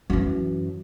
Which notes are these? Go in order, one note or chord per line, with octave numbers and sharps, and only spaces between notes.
F#2 E3